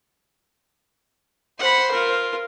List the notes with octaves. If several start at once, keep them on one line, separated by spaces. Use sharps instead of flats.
C5 F#5 B5
F4 A#4